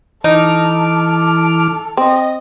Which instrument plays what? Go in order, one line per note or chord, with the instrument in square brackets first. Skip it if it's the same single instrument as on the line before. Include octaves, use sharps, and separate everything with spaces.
[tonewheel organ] E3 D6 F6 [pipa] D#4 [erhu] A4
[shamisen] C4 [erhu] D#5